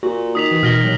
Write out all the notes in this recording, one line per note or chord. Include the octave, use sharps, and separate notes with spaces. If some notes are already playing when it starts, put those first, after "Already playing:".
A#2 F#4
D#3 D#6 B6 F7
E3
B2 F6 A#6 G7
D#2 F#3